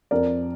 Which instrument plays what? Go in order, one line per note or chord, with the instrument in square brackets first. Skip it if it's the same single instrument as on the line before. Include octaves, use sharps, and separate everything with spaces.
[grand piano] F2 A#4 D5